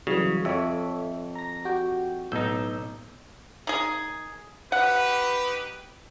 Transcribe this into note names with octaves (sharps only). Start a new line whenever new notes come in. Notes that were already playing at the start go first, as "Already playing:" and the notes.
C#3 E3 F#3 G3
F2 A4 C#5 E5
A#5 A#6
F#4 G4 G5
B1 A2 D#4 E6 G6
D#3 G#4
D#4 G4 B4 F#5